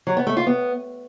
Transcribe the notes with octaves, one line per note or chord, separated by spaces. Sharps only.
F#3
B3
A3
F4
B3